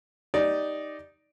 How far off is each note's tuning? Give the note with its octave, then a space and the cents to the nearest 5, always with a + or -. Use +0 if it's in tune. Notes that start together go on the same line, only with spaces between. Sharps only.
D#4 +0 G4 +0 D5 +0